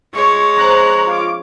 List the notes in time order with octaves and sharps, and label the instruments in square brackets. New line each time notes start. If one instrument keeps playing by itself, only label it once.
[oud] B2 A3 F4 [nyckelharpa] G#3 C#5 [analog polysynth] C#6
[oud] D3 F3 C4 [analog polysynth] A#5 F#6
[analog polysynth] F4 D6